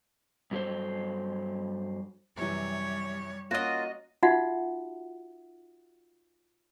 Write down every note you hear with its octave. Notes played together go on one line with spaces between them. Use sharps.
G2 F#3 D#4 A4 C5
F#2 C3 E3 G3 C#5
A#3 C#4 F4 F#4 D#5
D#4 F4 F#4 E5 F#5